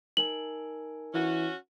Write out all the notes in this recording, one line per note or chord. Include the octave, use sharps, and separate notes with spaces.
D#4 A#4 G#5 F#7
E3 C#4 F#4